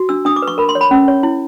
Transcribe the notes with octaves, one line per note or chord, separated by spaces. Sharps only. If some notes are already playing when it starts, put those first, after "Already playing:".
Already playing: F#4
D4 E6
D4 D#6
D6
B4
C#6
A#4 B5
C6
C#5
B5
C#4
C#5
E4